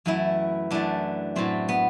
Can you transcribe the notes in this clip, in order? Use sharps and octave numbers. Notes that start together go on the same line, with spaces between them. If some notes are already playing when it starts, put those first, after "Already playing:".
F#2 E3 A3 E4
F#2 E3 A3 D4
A2 F#3 A3 C4
B3